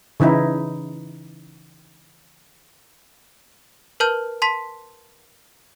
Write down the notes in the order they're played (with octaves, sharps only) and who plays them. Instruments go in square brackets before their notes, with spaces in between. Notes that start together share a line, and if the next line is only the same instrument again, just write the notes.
[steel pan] C#3 E3 D#4 E4
[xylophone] A#4 B4 A5 F6 G6
A5 C6 B6